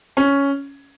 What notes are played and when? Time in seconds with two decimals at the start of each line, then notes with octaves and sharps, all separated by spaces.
0.17 C#4